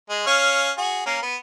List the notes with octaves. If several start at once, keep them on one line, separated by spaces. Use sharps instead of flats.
G#3
C#4 C#5 F5
F#4 G#4
A#3 C#4
B3